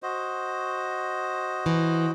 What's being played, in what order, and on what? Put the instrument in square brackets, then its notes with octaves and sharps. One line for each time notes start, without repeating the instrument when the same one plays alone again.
[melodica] F#4 C5 D#5
[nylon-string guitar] E3